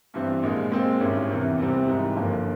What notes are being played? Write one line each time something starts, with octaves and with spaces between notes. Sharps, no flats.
G2 E3 G3 C4
A#1 A#2 G#3
A#2 G#3 C4
G#1 G2 G3 C#4 E4
E2 C3 E3
C2 C3 G3 C4
G#1 G#2 E3 G3
G1 G2 F3 A#3